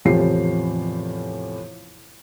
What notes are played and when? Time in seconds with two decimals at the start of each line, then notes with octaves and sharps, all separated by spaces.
0.05 E2 A2 C3 F3 G4 C7